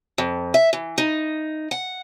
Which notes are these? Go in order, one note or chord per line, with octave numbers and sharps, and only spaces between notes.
F2
E5
E3
D#4
F#5